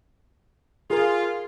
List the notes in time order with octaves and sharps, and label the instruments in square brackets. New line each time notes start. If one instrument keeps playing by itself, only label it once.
[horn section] F4 [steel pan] G#4 A#4